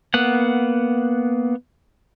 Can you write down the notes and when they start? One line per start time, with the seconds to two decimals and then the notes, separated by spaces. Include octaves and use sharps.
0.14 A#3 B3 F#5